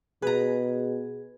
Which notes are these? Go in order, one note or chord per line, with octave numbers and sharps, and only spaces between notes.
B2 G#4 B4 A#5